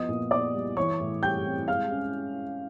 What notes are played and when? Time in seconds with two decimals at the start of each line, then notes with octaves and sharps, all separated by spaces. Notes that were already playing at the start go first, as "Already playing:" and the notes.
Already playing: F3 B3 D#5 D#6
0.09 A#2
0.31 B3 D5 D6
0.54 G3
0.77 E3 C#5 C#6
1.00 A2
1.23 G3 G5 G6
1.46 C4
1.68 G#3 F5 F6
1.91 C#4